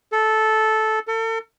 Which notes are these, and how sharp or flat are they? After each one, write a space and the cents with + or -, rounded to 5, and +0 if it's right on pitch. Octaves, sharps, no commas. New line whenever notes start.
A4 -10
A4 +40